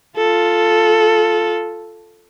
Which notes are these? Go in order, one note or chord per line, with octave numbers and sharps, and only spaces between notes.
F4 A4